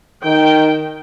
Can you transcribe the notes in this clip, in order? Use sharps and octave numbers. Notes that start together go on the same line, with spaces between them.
D#3 G5